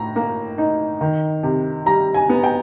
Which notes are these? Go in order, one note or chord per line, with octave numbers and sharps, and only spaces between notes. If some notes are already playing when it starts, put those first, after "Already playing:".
Already playing: A2 A#5
A#3
D#4
D#3
C3
G3 A#5
G#5
B3
G5